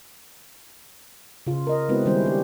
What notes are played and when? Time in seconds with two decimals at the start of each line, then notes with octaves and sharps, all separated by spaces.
1.47 C#3 F4
1.67 A#4 D#5
1.89 G#3 B3 C4 E4 F#4 B4
2.06 D#3 G3 C#4 E4 C5
2.22 C4 D4 G4